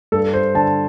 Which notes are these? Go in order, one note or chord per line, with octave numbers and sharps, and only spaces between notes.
G2 A4
C5
D3 A5